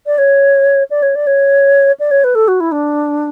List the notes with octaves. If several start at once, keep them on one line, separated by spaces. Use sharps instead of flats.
D5
C#5
D5
C#5
D5
C#5
D5
C#5
B4
A4
F#4
E4
D4